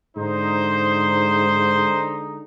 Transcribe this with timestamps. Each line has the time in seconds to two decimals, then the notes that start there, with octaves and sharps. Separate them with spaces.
0.17 G#2 D3 G#3 D#4 C5